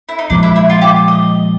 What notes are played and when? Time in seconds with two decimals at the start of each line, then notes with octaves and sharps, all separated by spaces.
0.09 E4
0.19 D#4
0.30 A#2 F3 G#3 D4
0.43 E4
0.56 E4
0.70 F4
0.81 G4
1.08 D#5